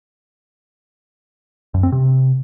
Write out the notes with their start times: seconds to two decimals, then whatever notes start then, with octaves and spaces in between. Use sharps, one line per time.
1.74 F#2
1.83 C4
1.92 C3